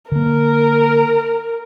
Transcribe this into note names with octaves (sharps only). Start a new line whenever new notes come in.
D3 A#3 A#4